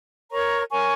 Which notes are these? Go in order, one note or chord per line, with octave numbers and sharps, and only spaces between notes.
A#4 C#5 A#5 C#6
A#4 C#5 G#5 C#6